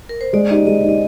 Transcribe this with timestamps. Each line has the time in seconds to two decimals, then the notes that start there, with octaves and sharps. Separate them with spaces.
0.09 A#4
0.21 C5
0.33 G#3 D5
0.50 D#4 G4 D#5
0.67 G#3 D#5
0.84 D#4 G4 D#5